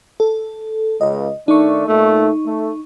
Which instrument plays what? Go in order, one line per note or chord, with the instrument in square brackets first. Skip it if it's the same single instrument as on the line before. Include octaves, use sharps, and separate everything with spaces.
[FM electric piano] A4
[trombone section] C#2 [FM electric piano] D#5
[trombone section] D#3 A3 D4 [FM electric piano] D#4 C#6
[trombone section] A#2 A3
A3